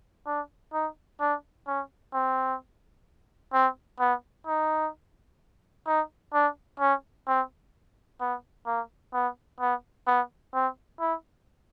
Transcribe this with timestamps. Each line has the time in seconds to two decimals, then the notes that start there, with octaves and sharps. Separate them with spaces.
0.27 D4
0.73 D#4
1.20 D4
1.67 C#4
2.14 C4
3.54 C4
4.00 B3
4.47 D#4
5.87 D#4
6.33 D4
6.80 C#4
7.27 C4
8.21 B3
8.67 A#3
9.13 B3
9.60 B3
10.07 B3
10.54 C4
11.00 E4